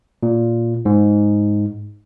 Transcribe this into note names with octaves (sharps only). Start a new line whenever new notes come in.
A#2
G#2